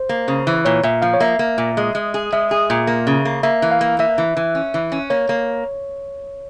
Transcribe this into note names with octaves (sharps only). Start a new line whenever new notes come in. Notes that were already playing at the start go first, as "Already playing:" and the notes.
Already playing: C5
A#3
C#3
E3
A#2 C#5
A#2 E5
F3 F5
C#5
A#3 E5
A#3
A#2
G#3
G#3
G#4
G#3 E5
G#4
A#2
A#3
C#3
A#3
A#3 E5
E3
F5
A#3
A#3 E5
E3
E3
C#4
E3
C#4
A#3 C#5
A#3